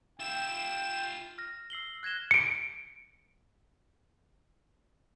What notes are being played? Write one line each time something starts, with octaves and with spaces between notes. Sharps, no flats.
F4 E5 G5 E7
F6 A#6
E6 C7 F#7 G7
F#6 G#6 A#6 E7 G7
C#7 D7